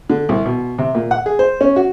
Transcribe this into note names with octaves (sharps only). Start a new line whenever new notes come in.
D3
C2
B2
C3
A#2
F#5
G#4
C5
C#4
F#4